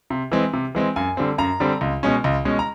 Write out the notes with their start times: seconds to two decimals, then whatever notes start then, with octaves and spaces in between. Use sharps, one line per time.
0.10 C3
0.32 E3 G#3 C4
0.53 C3
0.75 E3 G#3 C4
0.96 F#2 G#5
1.17 D3 G3 C4
1.38 F#2 A#5
1.60 D3 G3 C4
1.81 C#2
2.03 B2 G#3 C#4
2.24 C#2
2.45 B2 G#3 C#4
2.59 A#5